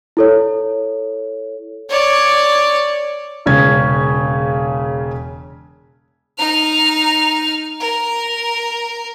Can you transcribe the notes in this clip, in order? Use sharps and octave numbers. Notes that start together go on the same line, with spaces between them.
E4 A4 C#5
C#5 D5
E1 C#3 C#4 G#6
D#4 F6
A#4